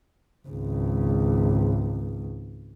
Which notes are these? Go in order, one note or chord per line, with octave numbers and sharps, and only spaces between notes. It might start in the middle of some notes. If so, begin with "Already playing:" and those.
G#1 C#2